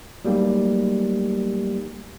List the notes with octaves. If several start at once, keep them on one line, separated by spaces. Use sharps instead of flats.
F#3 G3 A3 A#3 D#4 G4